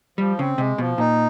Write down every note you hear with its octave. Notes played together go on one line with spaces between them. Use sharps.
F3 G3
C#3 C4
C3 G#3
B2 F3
A#2 D#4